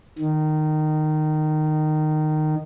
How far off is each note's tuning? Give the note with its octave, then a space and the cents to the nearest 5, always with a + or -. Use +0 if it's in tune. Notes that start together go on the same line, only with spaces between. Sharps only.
D#3 -15